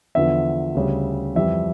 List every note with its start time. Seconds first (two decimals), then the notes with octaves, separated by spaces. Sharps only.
0.15 E2 D3 F3 E5
0.75 D2 C#3 G3
1.36 F2 E3 G3 E5